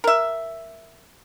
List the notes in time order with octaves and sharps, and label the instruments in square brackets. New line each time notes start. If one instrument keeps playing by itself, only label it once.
[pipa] A#4 E5